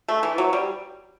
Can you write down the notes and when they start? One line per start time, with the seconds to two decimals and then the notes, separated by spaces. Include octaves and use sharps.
0.08 A3
0.23 E3
0.38 F#3
0.53 G3